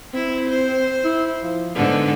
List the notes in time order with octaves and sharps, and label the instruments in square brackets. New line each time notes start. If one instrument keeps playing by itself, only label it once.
[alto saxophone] C4 [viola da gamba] E4
[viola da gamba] C5
[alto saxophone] E4
F3
[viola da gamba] G#2 D3 [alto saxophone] B3